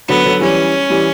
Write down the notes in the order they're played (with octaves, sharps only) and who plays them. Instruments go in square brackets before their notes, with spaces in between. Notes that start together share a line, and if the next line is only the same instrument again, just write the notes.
[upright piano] D3 F#3 [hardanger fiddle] B3
[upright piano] D3 F#3
[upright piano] E3 G3 [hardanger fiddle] C#4
[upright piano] E3 G3